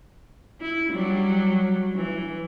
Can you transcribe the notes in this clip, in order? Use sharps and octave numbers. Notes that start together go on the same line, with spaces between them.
E4
F#3 G3
E3